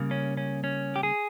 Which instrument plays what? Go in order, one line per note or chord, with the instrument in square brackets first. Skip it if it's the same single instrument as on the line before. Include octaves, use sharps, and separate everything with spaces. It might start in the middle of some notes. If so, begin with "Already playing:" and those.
Already playing: [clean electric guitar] C#3 G3 A#3
C#4
C#4
C#4
G4
G#4